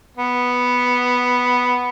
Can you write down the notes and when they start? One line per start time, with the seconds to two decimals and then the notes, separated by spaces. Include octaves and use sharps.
0.17 B3